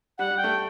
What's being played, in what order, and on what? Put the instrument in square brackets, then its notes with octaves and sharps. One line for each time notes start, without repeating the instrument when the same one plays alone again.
[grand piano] G3 [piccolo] F#5
[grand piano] G3
[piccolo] G5
[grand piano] A3